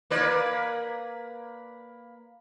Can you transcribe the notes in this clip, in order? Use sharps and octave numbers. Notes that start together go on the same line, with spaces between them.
A#3 B4 D5